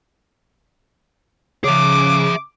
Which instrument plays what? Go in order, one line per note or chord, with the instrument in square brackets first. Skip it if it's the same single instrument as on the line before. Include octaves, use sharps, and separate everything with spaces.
[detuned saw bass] C#3 [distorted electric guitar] G#4 E5 [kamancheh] D6